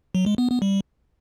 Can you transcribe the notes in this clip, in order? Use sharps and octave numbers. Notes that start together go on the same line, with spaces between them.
F#3
G#3
B3
B3
G3